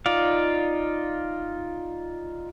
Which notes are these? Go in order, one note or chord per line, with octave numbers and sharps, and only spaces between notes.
D#4 F4 D5 F5